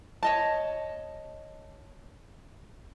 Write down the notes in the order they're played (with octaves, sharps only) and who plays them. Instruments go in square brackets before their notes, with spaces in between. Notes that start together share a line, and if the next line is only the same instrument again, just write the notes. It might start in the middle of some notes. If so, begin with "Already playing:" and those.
[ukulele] C#5 D#5 A5